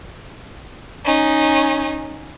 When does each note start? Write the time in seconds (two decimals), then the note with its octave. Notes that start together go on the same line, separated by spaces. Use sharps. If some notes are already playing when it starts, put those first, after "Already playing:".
1.05 C#4 D#4